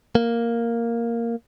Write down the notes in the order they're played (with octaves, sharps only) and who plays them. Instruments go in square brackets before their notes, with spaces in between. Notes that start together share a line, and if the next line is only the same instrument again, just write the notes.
[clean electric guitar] A#3